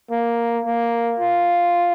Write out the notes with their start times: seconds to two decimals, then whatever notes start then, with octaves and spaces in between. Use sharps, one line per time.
0.11 A#3
0.65 A#3
1.20 F4